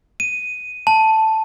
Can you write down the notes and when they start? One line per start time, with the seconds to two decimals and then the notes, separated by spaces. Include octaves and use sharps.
0.20 D#7
0.87 A5